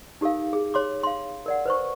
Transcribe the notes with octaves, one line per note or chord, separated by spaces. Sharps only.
D#4 G4 A4 A#4 F5
G#4
C#5 C6 D6
F5 C6
A#4 D5 F#5
B4 C5 C#6